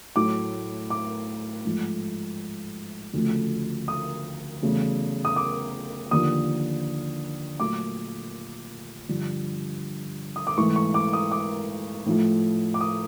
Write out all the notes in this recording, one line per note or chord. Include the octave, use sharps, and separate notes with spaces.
A2 F#3 A3 D6
D6
G#2 F3 A3
D2 C#3 F3 A3
D#6
E2 C#3 F#3 A3
D#6
D6
D#2 D3 F3 D#6
A#2 F#3 A3 D6
G2 D3 F3
D#6
D6
G#2 E3 A3 C#6
C#6
D6
D#6
D6
A2 F3 A3
D6
D#6